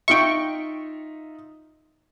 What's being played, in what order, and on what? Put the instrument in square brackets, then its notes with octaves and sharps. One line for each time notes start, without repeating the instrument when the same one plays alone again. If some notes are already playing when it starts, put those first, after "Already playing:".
[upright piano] D#4 F4 E5 [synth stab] G5 C#6